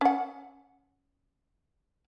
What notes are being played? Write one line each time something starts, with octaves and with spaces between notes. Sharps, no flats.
C#4 F#5